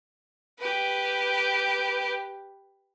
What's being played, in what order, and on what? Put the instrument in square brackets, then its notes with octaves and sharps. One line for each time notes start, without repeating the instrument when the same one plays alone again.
[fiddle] G4 B4